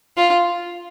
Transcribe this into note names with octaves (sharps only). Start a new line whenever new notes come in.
F4